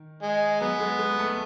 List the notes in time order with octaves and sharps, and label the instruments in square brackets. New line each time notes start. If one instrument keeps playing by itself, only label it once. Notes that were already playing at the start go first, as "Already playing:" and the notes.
Already playing: [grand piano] D#3
[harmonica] G#3
[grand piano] F#3 [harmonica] B3
[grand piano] G#3
G#3
A3